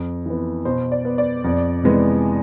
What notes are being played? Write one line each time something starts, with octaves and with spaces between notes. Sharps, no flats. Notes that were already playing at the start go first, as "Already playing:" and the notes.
Already playing: F2
E3 B3
B2 C5
D5
B3
D5
F2
C3 E3 G#3 B3